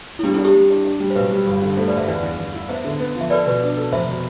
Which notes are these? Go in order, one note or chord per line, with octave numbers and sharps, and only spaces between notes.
E4
G3 B3 D4
C4 E4
D4
E4 G4
G3
D4
D4
G3
C5
B1 G4 B4
G3
G1
D3
A3 A4 C5
B4 D5
G1
C5 E5
E2 B4 D5
E2
E2
E4
B3 C5 E5
D3
B3
F3
E5
A4 B4 D5
B2 B4 D5
D4
A4
F1 C5 E5
B2